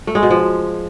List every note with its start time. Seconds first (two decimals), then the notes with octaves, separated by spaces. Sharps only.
0.07 A3
0.15 G#3
0.23 B2
0.30 F3